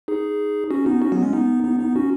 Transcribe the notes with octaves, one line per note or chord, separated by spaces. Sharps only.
D#4 G#4
C#4 F#4
B3 D#4
C#4 F#4
F#3 B3
G#3 C#4
B3 D#4
B3 D#4
B3 D#4
C#4 F#4